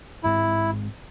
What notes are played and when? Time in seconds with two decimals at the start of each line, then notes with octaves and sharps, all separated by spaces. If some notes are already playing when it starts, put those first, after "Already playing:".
0.23 A1 G#2 G#3 C4 E4